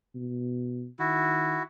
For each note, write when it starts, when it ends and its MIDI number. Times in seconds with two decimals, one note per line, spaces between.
0.15 0.88 47
0.99 1.60 51
0.99 1.63 64
0.99 1.63 66